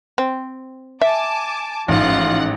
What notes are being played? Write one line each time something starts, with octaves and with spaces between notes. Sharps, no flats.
C4
E5 G#5 A5 D6
A1 G#2 F3 F4 F#5